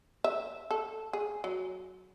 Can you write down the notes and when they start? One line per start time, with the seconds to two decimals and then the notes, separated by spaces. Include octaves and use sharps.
0.24 E5
0.71 A4
1.13 G#4
1.44 F#3